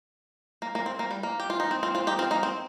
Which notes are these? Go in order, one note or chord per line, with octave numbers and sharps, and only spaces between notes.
A#3
A#3
C4
A#3
G3
A#3
G4
F4
D#4
C4
C4 F4
C4 F4
D#4 G4
C4 F4
A#3 D#4
C4